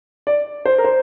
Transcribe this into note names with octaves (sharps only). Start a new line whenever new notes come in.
D5
C5
A#4
C5